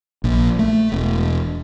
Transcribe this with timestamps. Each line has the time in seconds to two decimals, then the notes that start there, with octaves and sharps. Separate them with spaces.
0.24 A#1
0.59 A3
0.92 E1